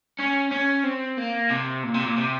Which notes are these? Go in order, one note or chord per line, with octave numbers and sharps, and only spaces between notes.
C#4
C#4
C4
A#3
C3
A#2
C3
A#2
C3